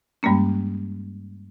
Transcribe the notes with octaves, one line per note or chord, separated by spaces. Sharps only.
G2 G3 G#3 A#3 C#4